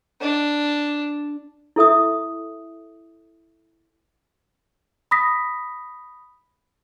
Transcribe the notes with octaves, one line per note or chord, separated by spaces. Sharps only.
D4
E4 A4 E5 D#6
B5 D#6 A#6 B6